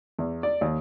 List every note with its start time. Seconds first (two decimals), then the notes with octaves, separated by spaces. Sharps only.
0.19 E2
0.43 D5
0.61 D#2